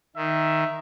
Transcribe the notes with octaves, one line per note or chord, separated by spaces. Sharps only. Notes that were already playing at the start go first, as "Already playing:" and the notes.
D#3 E5